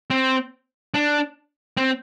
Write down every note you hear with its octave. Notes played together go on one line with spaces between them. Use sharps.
C4
D4
C4